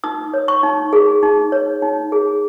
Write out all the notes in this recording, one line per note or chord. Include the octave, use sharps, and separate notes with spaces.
D#4 D#6
C#5
C#6
D#4
G#4
D#4
C#5
D#4
G#4